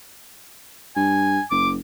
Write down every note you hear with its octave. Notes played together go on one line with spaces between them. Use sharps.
G2 G#5
F#1 D6